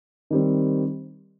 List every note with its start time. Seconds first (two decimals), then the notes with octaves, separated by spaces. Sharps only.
0.30 D#3 G3 C4